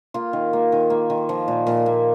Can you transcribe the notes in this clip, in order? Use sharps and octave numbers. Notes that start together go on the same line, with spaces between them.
A#3 F4
D#3
A#3
D#3
A#3
D#3
F3
A#2
A#2
A#3